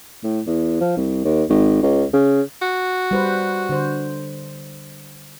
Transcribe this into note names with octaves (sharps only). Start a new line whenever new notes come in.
A2
E2
F3
C2
D#2
G#1
C#2
C#3
F#4
G3 B4 C5
D3 C5